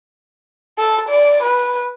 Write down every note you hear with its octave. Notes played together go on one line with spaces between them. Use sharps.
A4
D5
B4